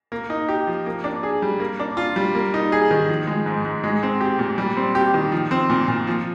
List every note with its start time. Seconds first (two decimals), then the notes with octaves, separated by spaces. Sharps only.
0.12 A#3
0.30 D#4
0.49 G4
0.67 F3
0.86 A#3
1.04 D4
1.23 G#4
1.42 G3
1.60 A#3
1.80 D4
1.97 F4
2.16 G3
2.35 A#3
2.54 D#4
2.72 G#4
2.91 D#3
3.09 F3
3.27 G#3
3.46 G#2
3.65 G#2
3.83 G#3
4.03 C4
4.21 G4
4.39 A#2
4.58 G3
4.77 C4
4.95 G4
5.14 D#3
5.32 F3
5.51 C4
5.70 A#2
5.88 A#2
6.07 F3